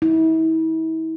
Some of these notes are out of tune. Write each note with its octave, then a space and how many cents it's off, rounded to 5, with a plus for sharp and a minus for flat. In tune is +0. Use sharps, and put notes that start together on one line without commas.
E4 -40